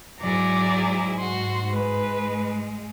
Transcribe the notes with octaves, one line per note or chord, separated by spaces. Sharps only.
G#2 F#3 E4 G#4 D5 A#5
F#4 C6
G#3 B4